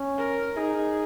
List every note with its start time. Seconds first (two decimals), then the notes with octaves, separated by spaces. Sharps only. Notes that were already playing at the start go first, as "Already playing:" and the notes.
Already playing: C#4
0.18 A#4
0.57 D#4 G#4